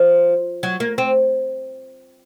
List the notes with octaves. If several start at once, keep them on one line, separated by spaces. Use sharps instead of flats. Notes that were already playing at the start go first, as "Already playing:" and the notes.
Already playing: F3
F#3
A#3
C4